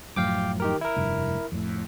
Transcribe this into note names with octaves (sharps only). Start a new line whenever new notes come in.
F#2 A2 F3 F5 G5 D6
D#3 G4 A#4
E4 A#4
F1 G2
F2 A2